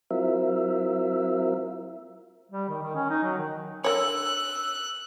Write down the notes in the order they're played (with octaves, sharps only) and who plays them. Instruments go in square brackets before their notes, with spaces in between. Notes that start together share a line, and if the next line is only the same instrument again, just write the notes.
[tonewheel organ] F#3 C4 E4 F4 A#4 E5
[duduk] G3
D#3
D#3
C#4
D#4
F#3
D#3
[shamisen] D3 A#4 C#5 [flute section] E6 [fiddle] F#6